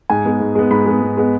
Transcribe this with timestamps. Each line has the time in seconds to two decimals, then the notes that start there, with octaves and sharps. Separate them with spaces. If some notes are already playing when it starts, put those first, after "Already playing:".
0.10 G#2 G#5
0.25 G#3 B3
0.40 G#2
0.55 G#3 B3
0.71 G#2 B5
0.86 G#3 B3
1.01 G#2
1.17 G#3 B3